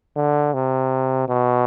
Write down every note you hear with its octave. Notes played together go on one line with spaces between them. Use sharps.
D3
C3
B2